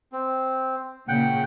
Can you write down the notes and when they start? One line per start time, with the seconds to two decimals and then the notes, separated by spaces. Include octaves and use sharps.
0.13 C4
1.09 A#2 C#3 F#5 G5